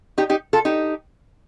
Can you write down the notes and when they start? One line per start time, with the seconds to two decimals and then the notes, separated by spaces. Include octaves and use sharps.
0.18 D#4 G4
0.30 D#4 G4
0.53 F4 A4
0.65 D#4 G4